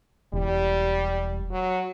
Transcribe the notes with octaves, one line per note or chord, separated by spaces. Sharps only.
E1 G3
F#3